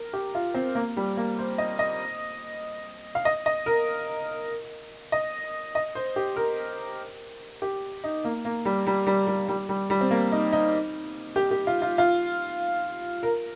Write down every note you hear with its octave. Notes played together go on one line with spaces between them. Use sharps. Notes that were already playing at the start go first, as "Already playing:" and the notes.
Already playing: A#4
G4
F4
C4
A#3
G3
A#3
C5
D#5
D#5
F5
D#5
D#5
A#4
D#5
D#5
C5
G4
A#4
G4
D#4
A#3
A#3
G3
G3
G3
G3
G3
G3
G3
C4
A#3
D#4
D#4
G4
G4
F4
F4
F4
A#4